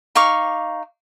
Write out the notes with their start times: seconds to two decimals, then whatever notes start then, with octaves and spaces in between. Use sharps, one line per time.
0.15 D#4 F5 C#6 D6